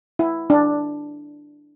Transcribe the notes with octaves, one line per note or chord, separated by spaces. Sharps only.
E4
D4